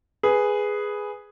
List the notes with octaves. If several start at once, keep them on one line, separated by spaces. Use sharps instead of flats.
G#4 B4